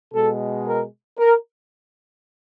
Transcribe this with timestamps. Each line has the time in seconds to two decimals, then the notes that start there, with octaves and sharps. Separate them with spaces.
0.13 B2 G#3 A4
0.67 A#4
1.18 A#4